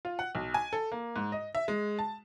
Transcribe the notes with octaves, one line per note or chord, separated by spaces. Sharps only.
F4
F#5
B1
G#5
A4
A#3
G#2
D#5
E5
G#3
A5